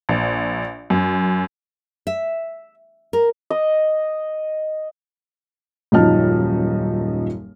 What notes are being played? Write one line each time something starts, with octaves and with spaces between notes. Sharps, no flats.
A#1
F#2
E5
A#4
D#5
D#1 F#2 F3 D#4 A5 F6